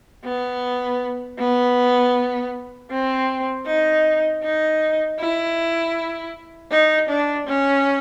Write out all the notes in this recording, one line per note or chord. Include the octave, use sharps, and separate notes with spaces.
B3
B3
C4
D#4
D#4
E4
D#4
D4
C#4